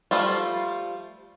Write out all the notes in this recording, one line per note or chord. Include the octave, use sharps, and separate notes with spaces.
F3 G3 A3 F4